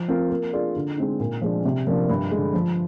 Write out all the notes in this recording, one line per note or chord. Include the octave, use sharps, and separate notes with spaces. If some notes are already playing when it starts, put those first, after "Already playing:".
Already playing: F3
C4 F4 A#4
A#3
D4 F4 G#4 D5
D3
G#3 C4 D#4
A#2
F3 G#3 D4
C3
F3 A#3 D4 F4
G2
D3 G#3
F3